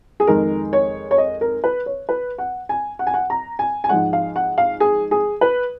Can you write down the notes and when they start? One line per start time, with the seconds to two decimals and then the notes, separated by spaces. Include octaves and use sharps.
0.20 G#4
0.27 F2 D#3 G#3 A#4
0.73 C#5
1.11 C#5
1.18 D#5
1.41 A#4
1.64 B4
1.86 C#5
2.09 B4
2.38 F#5
2.69 G#5
2.99 F#5
3.07 G#5
3.14 F#5
3.30 A#5
3.59 G#5
3.84 G#5
3.89 G#2 F3 G#3 F#5
4.13 F5
4.36 F#5
4.58 F5
4.80 G#4
5.11 G#4
5.41 B4